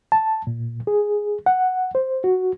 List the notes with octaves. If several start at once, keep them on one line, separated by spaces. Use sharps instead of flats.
A5
A#2
G#4
F#5
C5
F#4